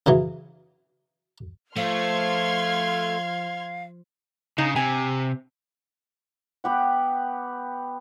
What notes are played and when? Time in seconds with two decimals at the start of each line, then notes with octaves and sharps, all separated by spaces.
0.06 C#3 E3 F#3
1.76 F3 A3 F5 C6 F6 G#6
4.58 C#3 D#4
4.76 C3 G#5
6.64 B3 G4 F#5